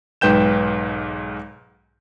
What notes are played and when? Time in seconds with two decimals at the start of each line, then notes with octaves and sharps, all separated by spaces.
0.21 B1 G#2 B4 G5 G6 E7